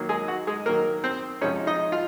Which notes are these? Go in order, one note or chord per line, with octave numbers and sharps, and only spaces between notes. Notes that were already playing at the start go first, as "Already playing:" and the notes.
Already playing: D#3 F#3 A#3
G#3 G#4
F#4
G#3 G#4
D#3 F#3 A#3 A#4
C4 C5
C3 F3 G#3 C#4 D#4 C#5
D#4 D#5
F4 F5